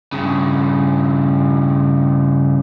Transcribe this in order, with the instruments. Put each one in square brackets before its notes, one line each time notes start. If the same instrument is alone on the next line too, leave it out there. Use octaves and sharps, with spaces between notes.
[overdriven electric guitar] G2 C#3